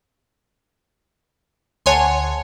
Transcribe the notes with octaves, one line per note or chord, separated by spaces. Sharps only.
D2 C#5 F#5 G#5 A5 C6